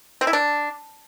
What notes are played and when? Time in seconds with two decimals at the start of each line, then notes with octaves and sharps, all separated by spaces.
0.21 C4
0.27 E4
0.33 D4